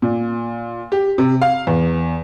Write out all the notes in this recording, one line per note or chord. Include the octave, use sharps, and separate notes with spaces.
A#2
G4
C3
F5
E2